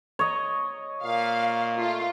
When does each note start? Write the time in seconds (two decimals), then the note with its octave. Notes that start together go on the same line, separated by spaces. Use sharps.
0.19 C#5 D#5
1.03 A#2 F5
1.78 A3 F4